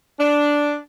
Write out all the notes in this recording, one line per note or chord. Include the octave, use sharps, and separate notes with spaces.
D4